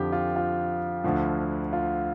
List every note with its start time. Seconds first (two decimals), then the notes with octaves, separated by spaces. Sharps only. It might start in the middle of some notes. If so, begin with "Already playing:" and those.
Already playing: F2 D3 F3 G4
0.13 F4
0.36 F4
1.04 D2 D3 F3
1.73 F4